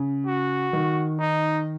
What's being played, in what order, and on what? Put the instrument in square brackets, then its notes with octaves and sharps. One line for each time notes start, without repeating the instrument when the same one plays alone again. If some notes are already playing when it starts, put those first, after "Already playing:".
Already playing: [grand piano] C#3
[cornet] F#4
[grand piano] D#3
[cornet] D#4